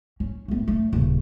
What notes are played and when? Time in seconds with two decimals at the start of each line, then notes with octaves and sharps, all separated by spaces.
0.20 C#4
0.48 A3 B3
0.68 A3
0.93 D#1 C#3